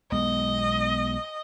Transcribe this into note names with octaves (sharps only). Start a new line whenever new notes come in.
B1 G#3 B3 D#5